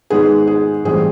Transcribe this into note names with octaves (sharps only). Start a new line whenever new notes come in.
G#2 D#3 G#3 B3 G#4
G#4
A2 E3 G3 C4 G#4